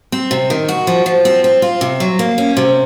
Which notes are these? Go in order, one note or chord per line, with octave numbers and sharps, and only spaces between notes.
C4
C3
D#3
F#4
F3
F3
C4
C4
F4
C3
F#3
A#3
C#4
C3